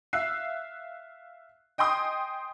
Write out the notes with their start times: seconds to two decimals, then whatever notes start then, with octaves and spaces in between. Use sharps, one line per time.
0.13 E5 F5 E6 F#6 C7
1.78 D#5 G5 G#5 C6 D#6